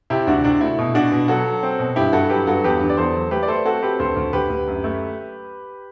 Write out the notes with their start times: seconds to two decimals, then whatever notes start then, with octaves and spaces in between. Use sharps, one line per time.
0.10 C3 E4 G4
0.27 D2 D4 F#4
0.44 C3 D4 F#4
0.61 A3 E4
0.79 B2
0.94 B2 D4 F#4
1.12 B2
1.28 F#3 F#4 A4
1.46 F#3
1.63 C4
1.79 B2
1.96 G2 E4 G4
2.13 G2 F#4 A4
2.29 F#3 G4 B4
2.47 G2 F#4 A4
2.64 E2 G4 B4
2.81 D3
2.89 D5
2.97 E2 A4 C5
3.14 F#3
3.31 A3 G4 B4
3.43 D5
3.48 A3 A4 C5
3.65 C4 F#4 A4
3.82 C4 G4 B4
3.99 D2 A4 C5
4.16 D2
4.33 D2 G4 B4
4.49 D2
4.67 F#2
4.84 A3